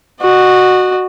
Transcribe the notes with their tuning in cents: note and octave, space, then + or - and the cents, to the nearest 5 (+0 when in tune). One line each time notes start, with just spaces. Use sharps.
F#4 -5 D#5 -40